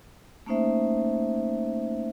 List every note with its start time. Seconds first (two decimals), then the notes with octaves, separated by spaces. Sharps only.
0.46 A3 A#3 C#4 D#4 C5 E5